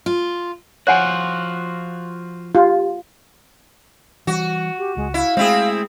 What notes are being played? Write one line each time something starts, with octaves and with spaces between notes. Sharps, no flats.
F4
F3 F4 F#4 C#5 F#5 G#5 F#6
F4 G4
E3 G3 F#4
G4
C#2 G#3
E4 F5
G#3 A3 C4 E4 G#4